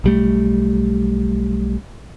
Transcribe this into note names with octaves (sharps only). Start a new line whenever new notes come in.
B1 G3 A3